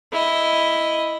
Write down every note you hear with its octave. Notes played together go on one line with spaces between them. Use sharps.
E4 D#5